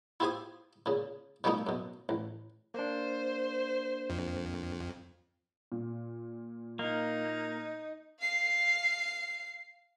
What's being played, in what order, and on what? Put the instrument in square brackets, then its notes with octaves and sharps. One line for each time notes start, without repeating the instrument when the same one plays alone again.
[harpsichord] E4 F4 G4 C5 G#5 D#6
A#2 C#3
B2 F3 G3 A3 A#3 D#4
F#2 B2
A1
[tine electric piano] A#3 D4 [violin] C5
[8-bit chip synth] F2
[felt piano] A#2
[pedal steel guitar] A#3 [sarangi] D#4
[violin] F5 C7